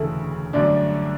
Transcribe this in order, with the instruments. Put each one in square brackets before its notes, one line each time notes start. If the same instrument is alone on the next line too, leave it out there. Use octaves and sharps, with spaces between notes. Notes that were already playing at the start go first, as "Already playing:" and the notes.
Already playing: [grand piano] E1 D2 C#3 E3 A3 [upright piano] A4
[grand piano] G1 F#2 D3 A3 D4 [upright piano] D5